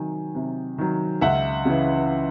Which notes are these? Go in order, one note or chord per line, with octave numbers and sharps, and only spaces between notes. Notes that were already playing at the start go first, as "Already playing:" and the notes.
Already playing: C3 D#3 F#3 G#5
C3
D#3 F#3
C#2 E5 F#5
C#3 E3